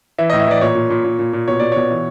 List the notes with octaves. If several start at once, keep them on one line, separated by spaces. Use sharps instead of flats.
E3 E5
D#5
A2
E5
E3 D5
A#2 C#5
A#2
A#2
A#2
A#2
A#2
B2 C#5
B2 D5
B2 C#5
E3